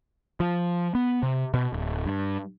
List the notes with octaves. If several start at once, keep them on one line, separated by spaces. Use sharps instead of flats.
F3
B3
C3
B2
D1
G2